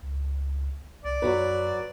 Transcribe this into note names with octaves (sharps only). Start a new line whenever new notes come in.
C#2
C2 D5
F#2 F#3 F#4 B4